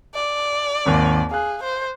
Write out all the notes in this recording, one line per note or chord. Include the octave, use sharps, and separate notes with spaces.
D5
G#1 D#2
G#4 F5 F#6
C5